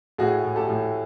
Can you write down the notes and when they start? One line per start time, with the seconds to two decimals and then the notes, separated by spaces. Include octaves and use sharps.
0.18 A2 F#4 G#4
0.44 A2
0.56 G4 A4
0.69 A2